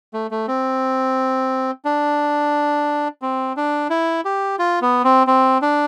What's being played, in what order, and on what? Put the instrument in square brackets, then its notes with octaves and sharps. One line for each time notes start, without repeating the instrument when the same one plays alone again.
[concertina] A3
A3
C4
D4
C4
D4
E4
G4
F4
B3
C4
C4
D4